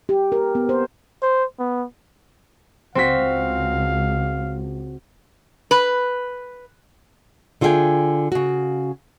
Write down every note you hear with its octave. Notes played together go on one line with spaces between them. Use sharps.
G4
A#4
B3
C5
C5
B3
C#2 C4 F#4 F5 B6
B4
D3 F4 G#4 F5 G5 G#5
C#3 F#4